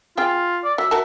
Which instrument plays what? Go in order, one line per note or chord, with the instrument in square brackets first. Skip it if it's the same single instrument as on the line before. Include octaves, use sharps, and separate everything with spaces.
[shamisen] C4 G#4 G5 [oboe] F4
[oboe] D5
[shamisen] F#3 [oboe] E5
[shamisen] F#4 A#4 A5